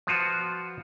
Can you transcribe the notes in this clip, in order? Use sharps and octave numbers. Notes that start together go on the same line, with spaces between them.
F3 B3 F4 F#4